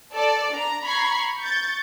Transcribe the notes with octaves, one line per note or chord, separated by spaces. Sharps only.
A4 D5
D4 A#5
A#5 B5 C#6 G#6 C7
C#6 G6 A6